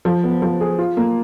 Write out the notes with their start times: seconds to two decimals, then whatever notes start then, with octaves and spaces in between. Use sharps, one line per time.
0.05 F3
0.23 B3
0.42 F3
0.61 G#4
0.79 F4
0.97 A#3